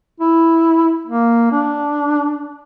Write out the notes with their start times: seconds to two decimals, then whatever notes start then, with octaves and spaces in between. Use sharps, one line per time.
0.20 E4
1.07 A#3
1.52 D4